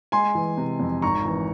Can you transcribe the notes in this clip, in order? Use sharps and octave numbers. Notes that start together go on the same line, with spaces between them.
G#3 G#5 C6
E3
C3
F2
G#1 A#5 C#6
E3